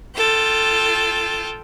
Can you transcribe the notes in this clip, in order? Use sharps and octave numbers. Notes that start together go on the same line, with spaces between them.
F4 A4 G5